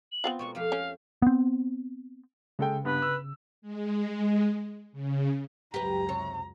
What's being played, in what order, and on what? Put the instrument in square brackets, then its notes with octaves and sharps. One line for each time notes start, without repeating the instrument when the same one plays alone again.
[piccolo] F#7
[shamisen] B3 C4 F4
[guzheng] B2 G#3 A#3 [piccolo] C#6
[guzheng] F2 A3 G4 [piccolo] F5
[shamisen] C#4 [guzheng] G5
[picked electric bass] B3 C4
[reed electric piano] C#3 [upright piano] G#3 A4 G5
[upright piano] G2 B3 [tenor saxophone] B4
[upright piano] E6
[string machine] G#3
C#3
[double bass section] C#2 F#2 F#3 [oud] G4 B4 [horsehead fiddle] A#5
[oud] C3 C#5